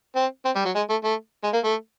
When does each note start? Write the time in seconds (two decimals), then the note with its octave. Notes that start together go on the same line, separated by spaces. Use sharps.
0.16 C4
0.45 C4
0.55 G3
0.65 F#3
0.75 G#3
0.90 A3
1.04 A3
1.43 G#3
1.54 A#3
1.64 A3